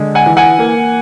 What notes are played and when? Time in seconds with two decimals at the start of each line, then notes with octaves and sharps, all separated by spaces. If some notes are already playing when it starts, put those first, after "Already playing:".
Already playing: D3 G#3
0.15 F#5 G#5
0.26 E3
0.37 F#5 G#5
0.59 A#3